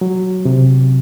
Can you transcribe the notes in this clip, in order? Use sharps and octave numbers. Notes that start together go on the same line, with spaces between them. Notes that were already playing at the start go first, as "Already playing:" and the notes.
F#3
C3